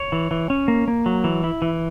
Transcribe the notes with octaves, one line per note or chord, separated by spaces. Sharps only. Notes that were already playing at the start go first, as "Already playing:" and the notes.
Already playing: C#5
E3
E3
C#4
A#3
A#3
F#3
E3
E4
E3